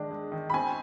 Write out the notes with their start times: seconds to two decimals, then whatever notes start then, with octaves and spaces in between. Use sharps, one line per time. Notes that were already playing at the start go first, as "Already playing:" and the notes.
Already playing: D#3 G#3 D4
0.11 G#3
0.32 D#3
0.50 B5
0.54 C4 G#5